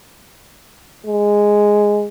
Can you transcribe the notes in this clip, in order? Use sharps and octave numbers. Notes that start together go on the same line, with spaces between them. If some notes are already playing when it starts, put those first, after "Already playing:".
G#3